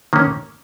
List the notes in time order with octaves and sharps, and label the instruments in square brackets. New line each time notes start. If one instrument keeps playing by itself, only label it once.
[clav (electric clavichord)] D#3 A#3 C#4